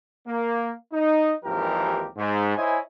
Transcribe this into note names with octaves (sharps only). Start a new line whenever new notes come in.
A#3
D#4
G#1 D#2 E3 F3 G4 A#4
G#2
E4 C5 C#5 D#5 G#5